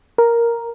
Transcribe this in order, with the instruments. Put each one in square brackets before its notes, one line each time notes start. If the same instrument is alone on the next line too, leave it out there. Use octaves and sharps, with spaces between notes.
[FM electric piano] A#4